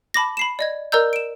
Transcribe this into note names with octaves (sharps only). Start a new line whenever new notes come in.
A5 B5 D6 A#6
B5 C7 E7
D5 D#5 G#6
A#4 D5 D#5 A#5 E6 G6
D7 E7